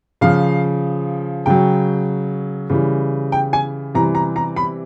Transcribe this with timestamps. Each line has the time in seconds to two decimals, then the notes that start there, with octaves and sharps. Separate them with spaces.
0.21 C#3 F3 F5
1.46 C#3 F#3 G5
2.70 C#3 E3 G3
3.32 G5
3.53 G#5
3.94 C3 E3 G3 A#5
4.15 A#5
4.36 A#5
4.56 B5